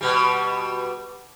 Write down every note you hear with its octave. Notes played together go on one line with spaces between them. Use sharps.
B2 G3